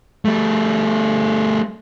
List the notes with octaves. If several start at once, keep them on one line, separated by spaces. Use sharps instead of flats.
G3 A3